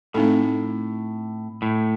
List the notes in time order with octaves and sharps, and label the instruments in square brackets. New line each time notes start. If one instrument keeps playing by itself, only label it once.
[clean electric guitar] A2 [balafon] A3 C4 D#4 A4
[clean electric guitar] A2